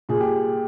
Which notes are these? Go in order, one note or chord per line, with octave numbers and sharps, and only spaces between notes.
A#2 G#4
G4